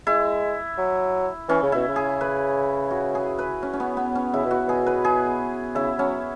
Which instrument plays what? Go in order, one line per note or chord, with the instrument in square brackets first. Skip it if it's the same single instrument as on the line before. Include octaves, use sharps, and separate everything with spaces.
[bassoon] G#3 [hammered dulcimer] E4
[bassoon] F#3
[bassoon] E3 [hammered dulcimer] C#4
[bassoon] C#3
[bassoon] B2 [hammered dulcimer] E4
[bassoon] C#3
[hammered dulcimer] G#4
B4
F#4
G#4
B4
C#4
C#4
B3
B3
C#4
[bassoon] C#3 [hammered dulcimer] E4
[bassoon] B2
[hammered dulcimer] F#4
[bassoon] B2 [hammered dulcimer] G#4
[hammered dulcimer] B4
G#4
[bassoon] C#3 [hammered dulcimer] E4
[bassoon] F#3 [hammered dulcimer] C#4